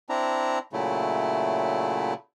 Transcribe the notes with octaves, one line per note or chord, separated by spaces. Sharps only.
C4 D4 E4 A#5
A#2 C#3 F#3 A3 E4